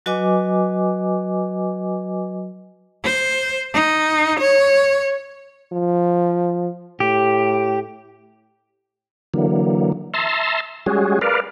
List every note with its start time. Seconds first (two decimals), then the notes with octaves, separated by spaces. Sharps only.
0.06 F#3 F#4 B4 D#5 G#5 D6
3.05 C5
3.74 D#4
4.40 C#5
5.72 F3
7.00 A2 G4
9.34 D3 E3 F#3 A#3
10.14 E5 A5 A#5 C6
10.86 G3 G#3 C#4 F#4 G#4
11.21 A#4 B4 D5 F5